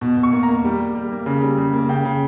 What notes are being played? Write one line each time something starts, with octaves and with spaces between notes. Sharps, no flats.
B2
B2
C#6
A#3
A#5
A#3
G3
G3
G3
A#3
C#3
G3
C#3
A#3
C#3 G5
C#3